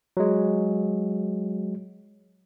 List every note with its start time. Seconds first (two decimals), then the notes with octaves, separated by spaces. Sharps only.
0.17 F#3 G#3